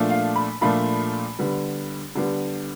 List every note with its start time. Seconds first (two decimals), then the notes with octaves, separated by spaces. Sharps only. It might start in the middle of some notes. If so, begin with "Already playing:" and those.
Already playing: A#2 F3 A3 D4 F4
0.10 F5
0.36 B5
0.61 A#2 F3 A3 D4 F4 B5
1.39 D3 G3 B3
2.15 D3 G3 B3